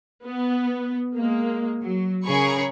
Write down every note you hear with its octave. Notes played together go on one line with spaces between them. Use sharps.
B3
G#3 A#3
F#3
C#3 G#4 A#4 C#5 B5 C#6